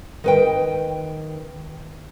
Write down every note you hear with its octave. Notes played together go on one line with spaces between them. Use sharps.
D#3 B4 G5